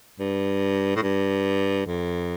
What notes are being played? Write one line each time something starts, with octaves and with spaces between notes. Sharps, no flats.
G2
A2
G2
F2